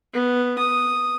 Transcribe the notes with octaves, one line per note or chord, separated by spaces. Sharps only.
B3
D#6